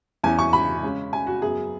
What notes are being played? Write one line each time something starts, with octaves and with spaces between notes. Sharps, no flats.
E2 E3 C#4 G#5
C#6
B5
C#3 G#3 C#4
G#5
F#4
F#2 F#3 B3 G#4